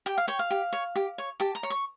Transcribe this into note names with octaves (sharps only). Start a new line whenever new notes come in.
G4 G5
F5
C#5 G5
F5
G4
C#5
G4
C#5
G4 A5
A#5
C#5
C#6